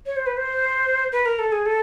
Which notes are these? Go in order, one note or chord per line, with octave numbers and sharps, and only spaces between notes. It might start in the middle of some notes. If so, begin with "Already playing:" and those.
C#5
C5
B4
C5
B4
A#4
A4
G#4
A4